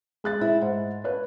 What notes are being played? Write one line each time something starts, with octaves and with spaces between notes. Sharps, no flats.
G#3 F#6 A6
E4
G#2
B4 C#5 F#6